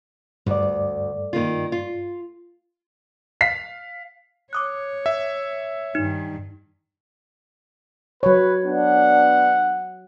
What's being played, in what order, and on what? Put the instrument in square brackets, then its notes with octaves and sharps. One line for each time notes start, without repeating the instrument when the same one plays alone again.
[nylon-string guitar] D2 [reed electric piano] G2 D5
[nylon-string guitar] D#3 A#3 F4
F4
[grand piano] F5 B6
[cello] C#5 [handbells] D6 D#6 F#6
[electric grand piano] E5
[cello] G2 D#3 [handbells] D#4
[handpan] F#3 C#5 [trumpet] B4
[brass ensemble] B3 D4 [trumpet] F#5